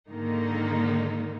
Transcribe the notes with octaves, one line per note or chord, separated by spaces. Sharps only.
G#2 D3 D#3 A#3 D#4